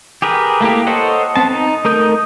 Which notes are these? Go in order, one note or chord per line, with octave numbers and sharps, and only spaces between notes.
G4 G#4 A#4 B4
A3 A#3 E4 G4
A4 C5 C#5 D#5 F#5
B3 C4 A5
D#4
A3 D#4 A#4 D#6 G6